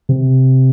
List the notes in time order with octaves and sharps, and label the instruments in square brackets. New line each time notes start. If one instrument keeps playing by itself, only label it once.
[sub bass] C3